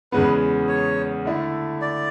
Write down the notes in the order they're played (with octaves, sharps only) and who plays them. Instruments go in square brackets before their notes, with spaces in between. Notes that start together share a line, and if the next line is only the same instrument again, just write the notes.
[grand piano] E2 C#3 G#3 B3 [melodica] B4
[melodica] C#5
[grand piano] D3 A3 E4
[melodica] D5